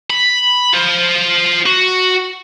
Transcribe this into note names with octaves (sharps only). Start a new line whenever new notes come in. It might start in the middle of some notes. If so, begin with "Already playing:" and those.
B5
F4 C5
F#4